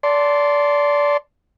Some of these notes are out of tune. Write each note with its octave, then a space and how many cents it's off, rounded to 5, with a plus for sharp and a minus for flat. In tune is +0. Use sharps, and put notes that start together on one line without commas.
D5 -20 A5 +0 C6 +0